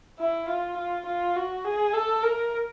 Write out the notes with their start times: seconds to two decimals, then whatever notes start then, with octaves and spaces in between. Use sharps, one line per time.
0.19 E4
0.48 F4
0.77 F4
1.06 F4
1.36 F#4
1.64 G#4
1.93 A4
2.23 A#4